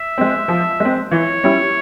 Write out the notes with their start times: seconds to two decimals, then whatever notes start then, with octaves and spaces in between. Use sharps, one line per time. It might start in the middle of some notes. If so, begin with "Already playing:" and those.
Already playing: E5
0.18 G#3 C4
0.48 F3
0.80 G#3 C4
1.11 E3 C#5
1.44 G3 C#4 E4